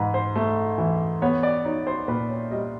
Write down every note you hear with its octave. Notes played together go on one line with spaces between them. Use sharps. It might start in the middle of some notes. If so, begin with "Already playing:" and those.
Already playing: G#2 E3 B4
C5
A3
E3
B3 C#5
D5
D#4 C#5
C5
A#2 B4
C#5
G3 D#5